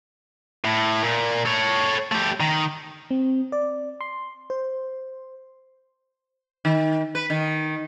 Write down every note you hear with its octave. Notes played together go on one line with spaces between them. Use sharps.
A2
A#2
A4 C#5
A3 G4
D#3
C4
D5
C6
C5
D#3
B4
D#3